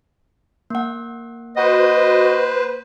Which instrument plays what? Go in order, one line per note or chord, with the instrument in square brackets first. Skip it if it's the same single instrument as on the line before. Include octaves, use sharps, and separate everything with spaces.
[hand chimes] A#3 F#5
[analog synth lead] F#4 [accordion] B4 C5 [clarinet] D#5